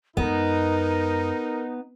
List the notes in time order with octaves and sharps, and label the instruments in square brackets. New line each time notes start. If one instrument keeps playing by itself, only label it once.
[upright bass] F#2 G#3 [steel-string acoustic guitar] B3 [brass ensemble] D#4 [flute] A#4